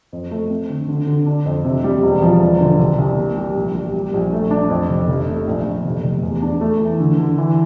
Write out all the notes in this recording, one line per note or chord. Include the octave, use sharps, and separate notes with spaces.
F2
A3
C4
D3
D3
D3
D4
F2
C3
G3
E1
F3
E1
D3
C2
C2
A#3
G3
A#1
G3
G3
A#1
A3
D4
F2
F1
F1
A3
A#1
A#1
F1
F1
E2
D4
A3
E3
D3
D3
E3